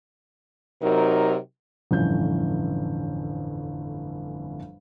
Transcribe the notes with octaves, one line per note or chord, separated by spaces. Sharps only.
C3 F#3 D#4 A#4
G1 F2 A2 E3 C#4 G6